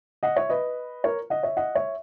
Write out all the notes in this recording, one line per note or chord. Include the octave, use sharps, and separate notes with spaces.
D#5 F#5
C#5 E5
B4 D#5
A#4 C#5
D#5 F#5
C#5 E5
D#5 F#5
C#5 E5